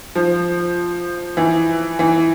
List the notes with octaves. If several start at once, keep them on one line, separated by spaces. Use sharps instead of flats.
F3
E3
E3